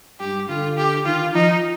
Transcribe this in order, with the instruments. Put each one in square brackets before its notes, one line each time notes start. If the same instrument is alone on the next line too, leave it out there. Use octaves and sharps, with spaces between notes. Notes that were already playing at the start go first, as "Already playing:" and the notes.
[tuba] G2 [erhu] G4
[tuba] D3 [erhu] F4
[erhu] G4
[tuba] D#3 [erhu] F4
[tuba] F3 [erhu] D#4